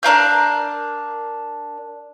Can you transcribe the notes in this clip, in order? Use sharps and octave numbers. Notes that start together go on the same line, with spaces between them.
D4 A#4 F5 G6